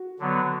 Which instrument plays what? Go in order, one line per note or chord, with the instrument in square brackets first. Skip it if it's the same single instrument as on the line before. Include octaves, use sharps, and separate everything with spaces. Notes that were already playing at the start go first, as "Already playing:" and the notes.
Already playing: [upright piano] F#4
[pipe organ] D3 F#3 B3